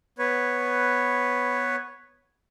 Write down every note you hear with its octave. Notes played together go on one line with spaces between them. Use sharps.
B3 B4 C#5